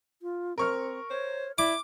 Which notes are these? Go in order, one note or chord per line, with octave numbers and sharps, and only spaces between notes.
F4
C4 A#4 C#6 F6
C5 C#5
E4 D5 D6